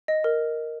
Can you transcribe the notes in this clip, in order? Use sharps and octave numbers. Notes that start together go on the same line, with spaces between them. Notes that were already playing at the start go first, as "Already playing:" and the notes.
D#5
A#4